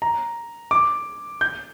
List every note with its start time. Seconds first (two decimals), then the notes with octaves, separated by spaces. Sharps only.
0.02 A#5
0.71 D6
1.41 G6